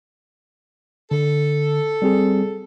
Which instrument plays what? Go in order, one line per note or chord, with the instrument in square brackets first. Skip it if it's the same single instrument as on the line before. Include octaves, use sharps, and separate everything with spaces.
[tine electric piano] D3 [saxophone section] A4
[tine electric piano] G3 C4 G#4